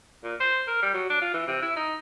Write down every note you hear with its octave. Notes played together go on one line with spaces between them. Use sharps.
A#2
C5
A#4
G3
F#3
D4
F4
E3
C3
E4
D#4